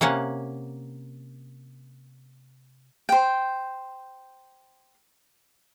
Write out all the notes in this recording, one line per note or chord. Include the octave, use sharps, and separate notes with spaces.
C3 A#3 C#4 F#5
C5 G5